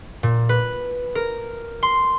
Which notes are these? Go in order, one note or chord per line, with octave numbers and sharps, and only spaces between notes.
A#2
B4
A#4
C6